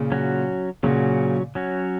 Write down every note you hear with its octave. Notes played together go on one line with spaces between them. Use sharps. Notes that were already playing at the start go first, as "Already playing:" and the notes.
Already playing: A#2 C#3
F#3 C#4 F#4
A#2 C#3 F#3 C#4 F#4
F#3 C#4 F#4